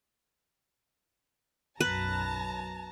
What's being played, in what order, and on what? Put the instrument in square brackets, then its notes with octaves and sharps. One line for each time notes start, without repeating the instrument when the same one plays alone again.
[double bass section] B1 F#2 [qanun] B4 [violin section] A5 A#5